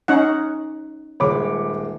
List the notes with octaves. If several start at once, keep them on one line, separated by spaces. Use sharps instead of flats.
C#4 D#4 F#5
D#1 G#3 C#5 B5 D6